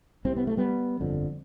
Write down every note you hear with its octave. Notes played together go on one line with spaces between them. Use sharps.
C2 C3 C4
B3
A3
G3 B3
G1 F2 D3